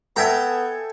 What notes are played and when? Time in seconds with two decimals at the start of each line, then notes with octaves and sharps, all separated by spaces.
0.16 B3 A4 E5 G5 G#5 A#5